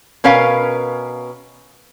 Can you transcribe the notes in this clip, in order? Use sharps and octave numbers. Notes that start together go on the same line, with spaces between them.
B2 C#4 A#4 B4 F5